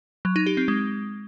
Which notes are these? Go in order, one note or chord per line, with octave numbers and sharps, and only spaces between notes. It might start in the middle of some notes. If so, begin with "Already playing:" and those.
F#3
D#4
G4
C4
G#3